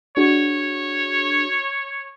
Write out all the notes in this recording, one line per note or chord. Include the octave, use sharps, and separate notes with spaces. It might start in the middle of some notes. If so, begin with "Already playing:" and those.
D4 F#4 G#4 C#5